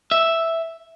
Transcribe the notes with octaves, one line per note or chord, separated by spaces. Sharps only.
E5